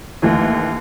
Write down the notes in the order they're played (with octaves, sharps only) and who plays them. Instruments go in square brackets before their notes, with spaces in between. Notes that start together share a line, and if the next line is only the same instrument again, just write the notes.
[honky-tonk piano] D#2 D3 E3 A3